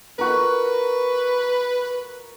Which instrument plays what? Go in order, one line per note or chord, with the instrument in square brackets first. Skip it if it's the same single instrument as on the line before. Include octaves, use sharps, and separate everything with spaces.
[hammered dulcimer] F#4 A#4 [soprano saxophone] B4